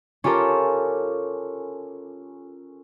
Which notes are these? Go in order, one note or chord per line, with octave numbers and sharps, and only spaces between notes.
C#4 F4 G4 A4 A#4